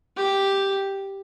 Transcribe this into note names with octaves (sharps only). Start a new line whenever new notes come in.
G4